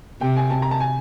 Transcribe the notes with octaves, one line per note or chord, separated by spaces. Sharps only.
C3 G5
G#5
A5
A#5
A5
G#5